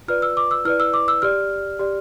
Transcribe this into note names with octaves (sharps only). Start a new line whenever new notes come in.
F4 B4 D5 F6
E6
D6
E6
E4 B4 D5 F6
E6
D6
E6
G4 D5 F6
G4 D5